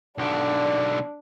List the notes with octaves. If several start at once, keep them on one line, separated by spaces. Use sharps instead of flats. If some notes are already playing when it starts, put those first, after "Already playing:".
B1 D3 D4